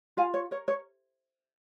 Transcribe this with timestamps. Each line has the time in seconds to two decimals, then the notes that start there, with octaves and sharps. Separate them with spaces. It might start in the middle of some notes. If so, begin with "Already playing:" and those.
0.17 F4 F5 G#5
0.34 C#5
0.51 A#4 C#5
0.68 C#5